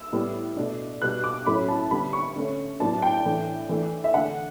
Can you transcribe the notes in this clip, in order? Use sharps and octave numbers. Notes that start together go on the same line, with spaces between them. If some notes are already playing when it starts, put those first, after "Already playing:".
Already playing: E6
A2 G3 B3
B2 A3 D4
B2 G3 B3 F#6
D6
A2 F#3 A3 C#4 B5
A5
D3 G3 B3 B5
C#6
D3 A3 C#4
A2 F#3 B3 D4 A5
G5
A2 E3 A3 D4
E3 A3 D4
E5
D3 A3 D4 F#5